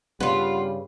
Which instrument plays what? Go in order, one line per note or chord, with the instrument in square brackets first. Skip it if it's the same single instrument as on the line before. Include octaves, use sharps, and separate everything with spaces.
[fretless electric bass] G2 C#3 [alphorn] G3 [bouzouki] B3 F4 [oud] B4